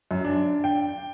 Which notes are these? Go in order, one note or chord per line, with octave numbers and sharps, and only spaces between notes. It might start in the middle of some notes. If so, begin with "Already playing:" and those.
F#2
D4
G5